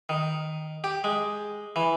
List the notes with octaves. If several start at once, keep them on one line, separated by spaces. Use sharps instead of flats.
D#3
G4
G#3
E3